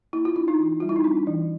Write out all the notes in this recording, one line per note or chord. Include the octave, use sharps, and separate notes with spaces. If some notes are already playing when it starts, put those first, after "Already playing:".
A#3 E4
F4
D4 E4
D#4
E3
G3 F4
E4
D#4
C4 D4
E3